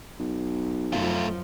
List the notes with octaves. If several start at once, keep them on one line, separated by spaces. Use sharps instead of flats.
B1
F#2 F3 A3 F4